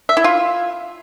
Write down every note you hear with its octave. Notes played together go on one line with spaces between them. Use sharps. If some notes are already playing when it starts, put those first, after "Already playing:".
E5
E4
F4